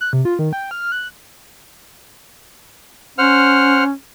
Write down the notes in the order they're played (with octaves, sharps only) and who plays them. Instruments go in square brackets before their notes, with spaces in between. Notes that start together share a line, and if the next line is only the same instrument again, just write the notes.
[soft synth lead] F#6
C3
F4
D#3
G5
F6
F#6
[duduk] C#4 [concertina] C5 F#5 F6